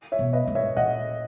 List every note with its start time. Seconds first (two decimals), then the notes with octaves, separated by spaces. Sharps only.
0.12 C#5 E5
0.19 B2
0.33 B4 D#5
0.47 G#2
0.55 C#5 E5
0.76 A#2 D#5 F#5